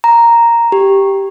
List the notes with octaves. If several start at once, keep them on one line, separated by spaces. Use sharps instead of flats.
A#5
G4